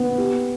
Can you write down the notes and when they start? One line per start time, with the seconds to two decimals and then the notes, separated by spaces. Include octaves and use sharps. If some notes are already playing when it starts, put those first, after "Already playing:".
Already playing: B3
0.18 G4